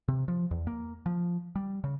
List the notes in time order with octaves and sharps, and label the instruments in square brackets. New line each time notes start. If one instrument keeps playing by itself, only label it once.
[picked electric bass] C3
F3
E2
A#3
F3
G3
C#3